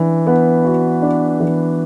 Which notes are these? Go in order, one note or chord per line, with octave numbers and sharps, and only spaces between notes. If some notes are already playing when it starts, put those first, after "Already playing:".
Already playing: E3 D4
B3
F#4
D4
E3